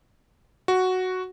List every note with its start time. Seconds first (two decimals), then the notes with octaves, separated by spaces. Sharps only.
0.68 F#4